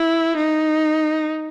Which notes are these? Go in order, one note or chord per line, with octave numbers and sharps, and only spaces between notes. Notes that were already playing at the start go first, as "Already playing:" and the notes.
Already playing: E4
D#4